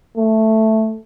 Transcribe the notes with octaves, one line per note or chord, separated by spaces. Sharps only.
A3